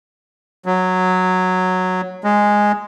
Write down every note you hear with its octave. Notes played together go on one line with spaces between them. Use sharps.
F#3
G#3